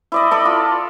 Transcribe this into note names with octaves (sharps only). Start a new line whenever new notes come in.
E4 D5 D#5
A4 D5 B5
F4